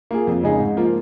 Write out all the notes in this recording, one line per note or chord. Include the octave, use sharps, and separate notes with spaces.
A#3 F4 G#4
F2
C#3 G#3 D#4 G#4
G#2
F3 A#3 F4